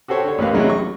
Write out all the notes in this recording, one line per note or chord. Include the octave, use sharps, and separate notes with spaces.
F#4 G4 A4 C5 C#5
D3 C#5
A1 D#2 A#3 B4 F5
A1 C3 F#3 D#4 E4 G#4
C#6